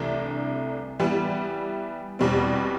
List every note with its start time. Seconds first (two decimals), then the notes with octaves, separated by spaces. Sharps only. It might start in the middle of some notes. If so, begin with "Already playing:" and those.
Already playing: C2 C3 E3 A3 D4
0.99 E3 G3 B3
2.19 E2 B2 G3 C4